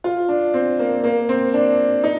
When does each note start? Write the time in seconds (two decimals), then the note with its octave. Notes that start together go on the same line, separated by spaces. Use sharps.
0.04 F4
0.29 D4
0.54 C4
0.79 A#3
1.04 A#3
1.29 C4
1.54 D4
2.04 D#4